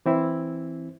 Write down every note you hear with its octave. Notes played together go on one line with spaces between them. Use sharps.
E3 C4 E4